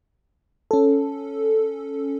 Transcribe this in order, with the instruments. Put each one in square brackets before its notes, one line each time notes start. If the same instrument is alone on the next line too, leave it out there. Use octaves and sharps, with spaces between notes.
[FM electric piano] C#4 A4